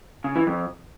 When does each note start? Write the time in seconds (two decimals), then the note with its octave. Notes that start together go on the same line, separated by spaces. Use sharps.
0.24 C#3
0.36 E3
0.47 F2